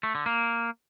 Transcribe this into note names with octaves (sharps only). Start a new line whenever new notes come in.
A3
D3
A#3